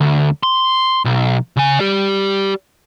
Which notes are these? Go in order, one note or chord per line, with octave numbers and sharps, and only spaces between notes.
D2
C6
B1
C#3 G#5
G4 D5